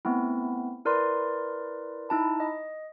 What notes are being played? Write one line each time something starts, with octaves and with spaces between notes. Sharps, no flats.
A3 B3 C4 E4
E4 A#4 B4 D5 C6
D#4 E4 A5 B5
D#5